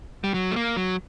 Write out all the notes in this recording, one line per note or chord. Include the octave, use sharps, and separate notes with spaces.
G3
F#3
A3
A#3
F#3